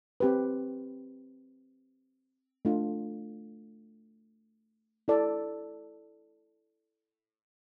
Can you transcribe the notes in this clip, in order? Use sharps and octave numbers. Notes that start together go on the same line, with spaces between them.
C4 G4 B4
A3 D4 F4
E4 A4 D5